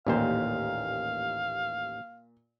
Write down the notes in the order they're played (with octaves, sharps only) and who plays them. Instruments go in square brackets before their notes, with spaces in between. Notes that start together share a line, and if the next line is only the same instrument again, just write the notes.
[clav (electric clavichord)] A1 D#2 C5 [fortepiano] A#2 [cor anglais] F5